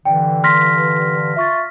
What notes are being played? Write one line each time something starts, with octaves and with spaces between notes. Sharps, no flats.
G2 D3 E3 G5
C6 F6 A#6 B6
F4 E5 C#6 A6